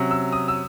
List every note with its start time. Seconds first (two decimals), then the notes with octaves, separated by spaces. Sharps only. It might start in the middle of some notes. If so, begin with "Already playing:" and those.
Already playing: C3 F#3 C#4
0.11 E6
0.33 D#6
0.48 E6